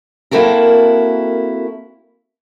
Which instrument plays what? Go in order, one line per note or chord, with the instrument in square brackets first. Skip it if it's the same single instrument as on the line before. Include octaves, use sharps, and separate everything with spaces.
[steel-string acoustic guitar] A#3 C4 E4 F#4 A4 A#4